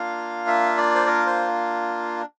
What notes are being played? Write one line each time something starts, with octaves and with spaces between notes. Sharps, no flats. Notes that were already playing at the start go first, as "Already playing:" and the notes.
Already playing: A#3 D4 F4 F5
E5
D5
C5
A#4
C5